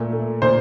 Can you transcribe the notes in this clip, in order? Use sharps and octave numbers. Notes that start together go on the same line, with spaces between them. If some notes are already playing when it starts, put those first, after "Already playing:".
Already playing: A#2 A3
A3
A#2 C5